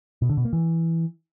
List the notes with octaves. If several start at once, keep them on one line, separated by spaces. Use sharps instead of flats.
B2
D3
B2
A#3
E3